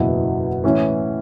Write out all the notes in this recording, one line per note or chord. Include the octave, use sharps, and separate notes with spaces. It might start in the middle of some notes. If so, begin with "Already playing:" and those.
Already playing: F#1 E2 B2 B3 E4
A2 E3 C#4 E4